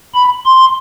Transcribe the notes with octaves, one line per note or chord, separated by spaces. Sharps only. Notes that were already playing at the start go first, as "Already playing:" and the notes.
B5
C6